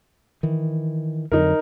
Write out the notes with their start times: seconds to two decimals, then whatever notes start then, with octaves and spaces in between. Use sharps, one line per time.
0.43 D#3 E3
1.32 F2 D3 F#3 D#4 A#4